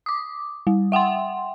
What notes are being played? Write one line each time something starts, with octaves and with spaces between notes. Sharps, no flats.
D6 D#6
G3
E5 F#5 G5 C6